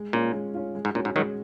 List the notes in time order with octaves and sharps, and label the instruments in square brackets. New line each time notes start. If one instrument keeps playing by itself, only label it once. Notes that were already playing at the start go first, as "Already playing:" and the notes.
Already playing: [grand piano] G#3
[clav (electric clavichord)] A#2 [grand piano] C#4 F4
[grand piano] G#3
C#4 F4
G#3
[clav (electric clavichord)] G#2
[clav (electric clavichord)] A#2 [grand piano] C#4 F#4
[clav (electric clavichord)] G#2
[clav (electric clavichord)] D#3 F#3 [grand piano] G#3